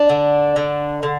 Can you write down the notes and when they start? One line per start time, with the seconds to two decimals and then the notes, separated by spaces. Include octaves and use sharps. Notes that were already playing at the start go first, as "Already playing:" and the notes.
Already playing: D4
0.09 D3
0.56 D3
1.03 D3